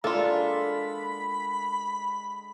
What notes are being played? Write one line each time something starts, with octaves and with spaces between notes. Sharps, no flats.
D3 G#3 A#3 F4 A4 B5